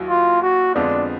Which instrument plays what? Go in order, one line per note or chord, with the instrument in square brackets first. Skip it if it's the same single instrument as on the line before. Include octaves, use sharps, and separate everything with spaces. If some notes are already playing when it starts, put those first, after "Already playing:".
Already playing: [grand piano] D#2 F#3 E4
[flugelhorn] F4
F#4
[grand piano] F2 D3 F3 G#3 B3 [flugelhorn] D4